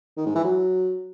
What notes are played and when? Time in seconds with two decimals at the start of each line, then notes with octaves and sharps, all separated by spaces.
0.17 D#3
0.26 G#2
0.35 E3
0.44 F#3